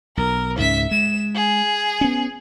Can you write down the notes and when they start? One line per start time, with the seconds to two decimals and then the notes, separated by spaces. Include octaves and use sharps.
0.17 B1 A#4
0.58 C#2 G#2 C#4 E5 B6
0.91 G#3 E7
1.35 G#4
2.01 B3 C#4